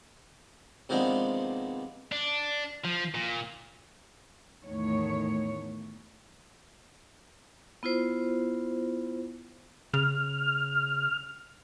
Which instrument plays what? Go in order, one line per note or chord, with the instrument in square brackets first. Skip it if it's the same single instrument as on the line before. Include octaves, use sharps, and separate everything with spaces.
[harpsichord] C3 D#3 F3 G#3 B3 D4
[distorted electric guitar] D4
F3
A#2
[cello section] E2 A2 D#3 A3 C#5
[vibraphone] B3 E4 F4 C5
[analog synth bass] C#3 [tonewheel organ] F6